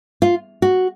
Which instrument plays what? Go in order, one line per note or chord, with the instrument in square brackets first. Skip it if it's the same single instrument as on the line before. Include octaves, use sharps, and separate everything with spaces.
[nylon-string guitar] F4
F#4